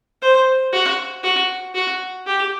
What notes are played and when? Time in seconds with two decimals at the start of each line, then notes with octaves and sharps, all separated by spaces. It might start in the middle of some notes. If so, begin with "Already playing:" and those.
0.22 C5
0.73 F#4
1.24 F#4
1.75 F#4
2.26 G4